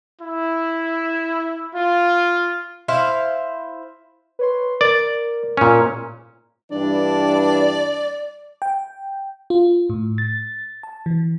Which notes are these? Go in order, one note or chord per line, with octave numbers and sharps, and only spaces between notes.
E4
F4
E4 C5 F5
B4 C#5 C6
A#4 D5
A#2 C#4
G2 E3 D4 D5
G5
F4
A2
A6
A5
E3